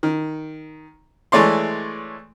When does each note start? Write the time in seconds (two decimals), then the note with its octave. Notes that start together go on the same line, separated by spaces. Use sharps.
0.03 D#3
1.32 E3 G#3 A3 C#5 D5 C6